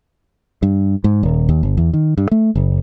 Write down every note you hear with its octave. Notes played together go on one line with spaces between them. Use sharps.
G2
G#2
D#1
D#2
G1
E2
D#3
G2
A3
F#1